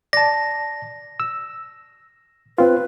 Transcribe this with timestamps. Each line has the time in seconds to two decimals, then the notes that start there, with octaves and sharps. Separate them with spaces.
0.13 D5 A5 A#6
1.20 E6
2.58 C4 F4 B4